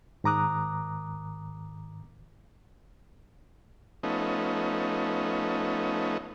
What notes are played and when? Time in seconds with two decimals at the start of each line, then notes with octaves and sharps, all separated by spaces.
0.24 G#2 D#3 A#5 D6 D#6 F#6
4.03 F3 A3 B3 C#4 D#4